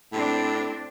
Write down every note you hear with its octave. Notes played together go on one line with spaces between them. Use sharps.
A2 C4 D4